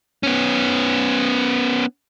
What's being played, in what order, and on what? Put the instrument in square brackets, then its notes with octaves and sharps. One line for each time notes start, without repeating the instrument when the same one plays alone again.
[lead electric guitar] B3 C#4